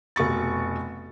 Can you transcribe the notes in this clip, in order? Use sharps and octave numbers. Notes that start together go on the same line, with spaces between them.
F1 B2 C#6 A6